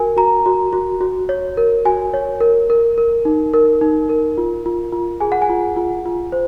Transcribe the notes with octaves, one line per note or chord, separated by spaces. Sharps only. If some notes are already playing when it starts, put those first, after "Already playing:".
Already playing: F#4 A#4 G#5
F#4 A#5
F#4
F#4
F#4
C#5
A#4
F#4 G#5
C#5
A#4
A#4
A#4
D#4
A#4
D#4
A#4
F4
F4
F4
G#4 G#5
F#5
G#5
F4
F4
F4
C5